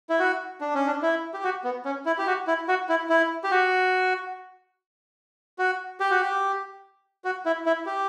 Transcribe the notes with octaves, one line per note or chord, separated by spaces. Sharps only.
E4
F#4
D4
C#4
D4
E4
G4
F#4
B3
C#4
E4
G4
F#4
E4
F#4
E4
E4
G4
F#4
F#4
G4
F#4
G4
F#4
E4
E4
G4